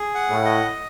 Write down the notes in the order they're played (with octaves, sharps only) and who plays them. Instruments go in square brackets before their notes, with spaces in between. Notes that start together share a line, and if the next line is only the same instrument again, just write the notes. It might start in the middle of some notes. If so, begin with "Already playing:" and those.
Already playing: [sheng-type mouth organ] G#4
F#5
[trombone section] A2
[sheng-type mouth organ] D#5